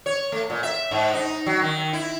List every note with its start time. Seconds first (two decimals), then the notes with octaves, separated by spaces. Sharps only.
0.06 C#5
0.32 A3
0.50 A#2
0.63 E5
0.91 G#2
1.13 D#4
1.46 F#3
1.62 D#3
1.93 E4